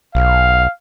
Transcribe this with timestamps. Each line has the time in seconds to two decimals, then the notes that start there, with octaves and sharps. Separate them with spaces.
0.15 B1 F5